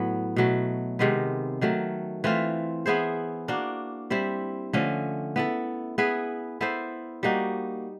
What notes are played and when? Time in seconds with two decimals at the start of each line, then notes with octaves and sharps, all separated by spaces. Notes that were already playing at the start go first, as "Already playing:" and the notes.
Already playing: A2 F#3 B3
0.36 B2 F#3 A3
0.99 C3 D#3 G#3 B3
1.61 D#3 F#3 A3
2.24 E3 A3 C4 F4
2.86 B3 E4 G#4 C5
3.48 A#3 D4 F#4
4.10 G3 C4 E4
4.73 D3 F3 A3 C#4
5.36 B3 E4 A4
5.98 B3 E4 G#4 B4
6.61 B3 E4 A4 C5
7.23 G3 A#3 D#4 F#4